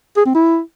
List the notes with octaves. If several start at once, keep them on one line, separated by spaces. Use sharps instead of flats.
G#4
C4
E4